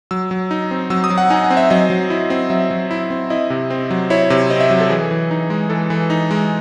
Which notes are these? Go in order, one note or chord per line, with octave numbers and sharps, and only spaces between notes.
F#3 E6
F#3
D#4
C4
F#3 E6
D#6
F#3
F#5
D#4 G#5
F#5
C4
E5
F#3 D#5
F#3
E4
C4
F#3 E5
F#3
E4
C4
E4 D#5
C3
C4
F#3
E4 C#5
C3
C4 D#5
E5
F#3
A4
E3 G#4
E3
D#4
G#3
E3 A4
E3
D#4
G#3